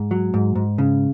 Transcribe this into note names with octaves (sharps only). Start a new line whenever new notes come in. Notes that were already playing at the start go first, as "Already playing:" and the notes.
Already playing: G#2
F#3
G#2
G#2
C#3